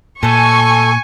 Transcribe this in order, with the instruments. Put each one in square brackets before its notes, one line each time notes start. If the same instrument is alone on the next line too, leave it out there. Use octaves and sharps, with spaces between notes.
[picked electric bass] A#2 [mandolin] A3 A4 [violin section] G#5 C#6